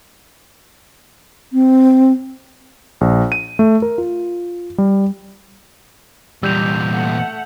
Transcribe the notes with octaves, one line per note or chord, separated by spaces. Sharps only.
C4
A#1
D#7
A3
A#4
F4
G3
E2 A#2 G3 E6 G6 F7
A3 F#5